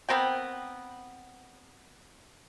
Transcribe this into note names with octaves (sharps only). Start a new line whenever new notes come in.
B3 C4 A#4 G5